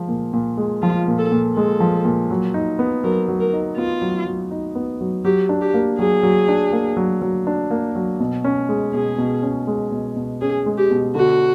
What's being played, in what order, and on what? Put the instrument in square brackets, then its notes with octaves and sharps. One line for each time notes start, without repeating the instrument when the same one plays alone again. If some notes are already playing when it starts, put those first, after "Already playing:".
Already playing: [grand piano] F3 G#3
A#2
A#2
G#3
[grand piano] F3 [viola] F4
[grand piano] A#2
[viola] A4
[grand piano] A#2
[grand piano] G#3 [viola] A4
[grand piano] F3
A#2
F#3
D#4
B3
[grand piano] F#3 [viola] A#4
[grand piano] F#3
[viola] A#4
[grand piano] D#4
[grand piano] B3 [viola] F4
[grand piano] F#3
F#3
D#4
B3
F#3
[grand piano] F#3 [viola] G4
[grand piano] D4
[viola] G4
[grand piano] A#3
[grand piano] F#3 [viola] G#4
[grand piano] F#3
D4
A#3
F#3
F#3
D4
A#3
F#3
B2
C#4
G#3
[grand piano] B2 [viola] G#4
[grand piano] B2
C#4
G#3
B2
B2
[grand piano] C#4 [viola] G#4
[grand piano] G#3
[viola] G4
[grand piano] B2
[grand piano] D3 [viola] F#4